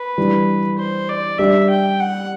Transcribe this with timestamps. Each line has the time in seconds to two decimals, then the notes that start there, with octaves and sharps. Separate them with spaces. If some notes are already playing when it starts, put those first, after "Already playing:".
Already playing: B4
0.18 E3 G3 D4
0.78 C5
1.09 D5
1.38 G3 D4 G4 D5 E5
1.70 G5
2.00 F#5